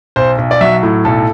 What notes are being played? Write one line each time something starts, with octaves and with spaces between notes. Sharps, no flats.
B1 C5
B1
D5
F#3 E5
A2
B1 A4